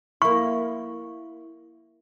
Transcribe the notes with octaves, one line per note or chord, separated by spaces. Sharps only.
A#3 E4 C#6